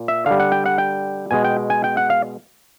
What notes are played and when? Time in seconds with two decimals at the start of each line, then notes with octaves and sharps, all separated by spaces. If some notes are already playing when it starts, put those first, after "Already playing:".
Already playing: A#2
0.08 E5
0.26 D3 G3 F5
0.40 F#5
0.52 G5
0.66 F#5
0.78 G5
1.31 B2 G#3 G#5
1.44 G5
1.70 G#5
1.84 G5
1.97 F#5
2.10 F5